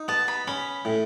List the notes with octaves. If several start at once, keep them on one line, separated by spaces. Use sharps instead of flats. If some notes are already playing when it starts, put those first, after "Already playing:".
Already playing: D#4
B3 A5
B5
C#4 B5
A2